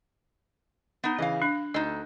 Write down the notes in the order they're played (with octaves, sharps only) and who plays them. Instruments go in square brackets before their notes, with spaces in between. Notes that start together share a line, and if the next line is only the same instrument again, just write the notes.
[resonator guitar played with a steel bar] B3 D#4
[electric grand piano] C#3 E3 [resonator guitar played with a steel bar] D#5 F5
[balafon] D4 [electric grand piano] F#6
[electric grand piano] D2 [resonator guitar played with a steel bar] D#4 A4 [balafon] D#5